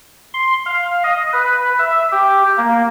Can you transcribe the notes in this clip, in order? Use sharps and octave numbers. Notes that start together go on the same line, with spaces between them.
C6
F5
D#5
B4
E5
G4
A#3